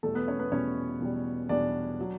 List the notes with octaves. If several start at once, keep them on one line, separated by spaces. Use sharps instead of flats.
E2 B2 G3 A3 A4
B3 B4
C#4 C#5
B3 B4
E2 B2 G3 C#4 C#5
E2 B2 G3
E2 B2 G3 D4 D5
F#3